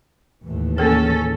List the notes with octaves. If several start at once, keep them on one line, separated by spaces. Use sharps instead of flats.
D#2 A2 E3
A#3 C#4 G#4 A4